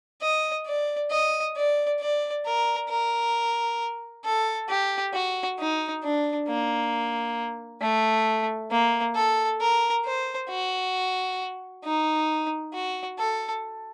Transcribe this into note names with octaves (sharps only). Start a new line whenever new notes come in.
D#5
D5
D#5
D5
D5
A#4
A#4
A4
G4
F#4
D#4
D4
A#3
A3
A#3
A4
A#4
C5
F#4
D#4
F#4
A4